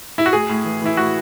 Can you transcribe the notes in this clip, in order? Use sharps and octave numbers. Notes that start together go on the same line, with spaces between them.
E4
F#4
A2 G#4
A2
E3
E3 E4
A2 F#4